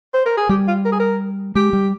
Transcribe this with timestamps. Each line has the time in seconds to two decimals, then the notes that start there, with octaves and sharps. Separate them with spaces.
0.14 C5
0.26 A#4
0.37 G#4
0.49 G3 G4
0.68 F4
0.85 A#4
0.92 G#4
1.00 A#4
1.55 G#3 G4
1.73 G3